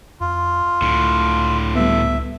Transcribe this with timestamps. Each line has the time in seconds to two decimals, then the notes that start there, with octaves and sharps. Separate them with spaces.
0.21 F2 F4
0.82 C#2 A2 D3
1.75 G3 B3 E5